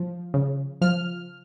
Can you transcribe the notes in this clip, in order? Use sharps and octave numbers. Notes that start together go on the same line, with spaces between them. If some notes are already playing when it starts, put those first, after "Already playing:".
Already playing: F3
C#3
F3 F6